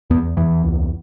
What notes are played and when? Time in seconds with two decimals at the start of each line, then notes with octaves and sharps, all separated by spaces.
0.10 E2 B3
0.37 E2 E3
0.63 C#2